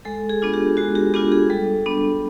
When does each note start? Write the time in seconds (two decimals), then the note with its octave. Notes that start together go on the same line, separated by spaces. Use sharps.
0.05 G#3 A4
0.29 G#4
0.42 B3 D4 F4
0.54 G4
0.77 G#3 F#4
0.95 G4
1.14 B3 D4 F4 G4
1.32 G#4
1.50 G3 A4
1.86 B3 D4